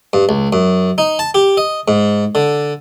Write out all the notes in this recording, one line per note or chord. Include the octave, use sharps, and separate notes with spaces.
G2
C#2
F#2
D#4
A5
G4
D#5
G#2
D3